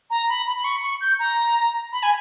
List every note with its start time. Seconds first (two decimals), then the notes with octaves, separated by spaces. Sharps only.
0.10 A#5
0.29 B5
0.46 B5
0.57 B5
0.64 C#6
0.83 C#6
1.01 G6
1.19 A#5
1.92 B5
2.03 G#5